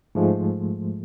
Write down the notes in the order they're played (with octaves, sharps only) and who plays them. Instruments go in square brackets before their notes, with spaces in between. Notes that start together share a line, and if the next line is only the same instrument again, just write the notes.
[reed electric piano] G#2 F3 G#3 A3